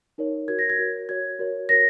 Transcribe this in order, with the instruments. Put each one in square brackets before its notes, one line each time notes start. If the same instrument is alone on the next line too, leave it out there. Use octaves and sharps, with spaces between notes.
[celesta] D#4 A#4 C#5
F#4 A#4 C#5 G#6
A#6
G#6
F#4 A#4 C#5
F#4 C#5 G#6
F#4 A#4 C#5
F#4 A#4 C#5 A#6